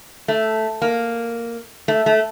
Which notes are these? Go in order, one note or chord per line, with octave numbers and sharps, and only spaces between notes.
A3
A#3
A3
A3